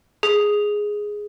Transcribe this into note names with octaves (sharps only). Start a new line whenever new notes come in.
G#4